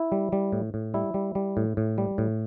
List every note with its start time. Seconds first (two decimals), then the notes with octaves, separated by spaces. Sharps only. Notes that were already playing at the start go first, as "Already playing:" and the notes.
Already playing: E4
0.12 G3
0.32 G3
0.53 A2
0.74 A2
0.94 G3 E4
1.14 G3
1.35 G3
1.57 A2
1.77 A2
1.98 G3
2.18 A2